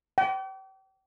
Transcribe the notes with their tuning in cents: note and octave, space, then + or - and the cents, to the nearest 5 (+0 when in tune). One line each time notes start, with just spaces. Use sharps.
G5 -35